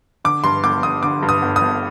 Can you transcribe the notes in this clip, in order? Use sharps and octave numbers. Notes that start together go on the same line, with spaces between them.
D3 D6
G2 C6
G1 D6
G1 D#6
D3 D6
G2
D#6
G1
D#6
G1